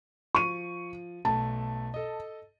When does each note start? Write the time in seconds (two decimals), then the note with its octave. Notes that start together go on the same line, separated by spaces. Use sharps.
0.35 F3 C#6 D#7
1.25 B1 A3 A5
1.94 A4 D#5